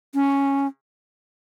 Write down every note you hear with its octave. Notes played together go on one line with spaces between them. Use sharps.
C#4